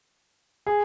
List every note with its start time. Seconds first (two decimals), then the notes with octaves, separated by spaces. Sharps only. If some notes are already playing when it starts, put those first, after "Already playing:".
0.66 G#4